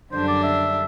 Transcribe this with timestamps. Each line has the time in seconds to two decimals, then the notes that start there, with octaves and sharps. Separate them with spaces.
0.12 F#2 D3 G3 D4 C5
0.28 D5
0.44 E5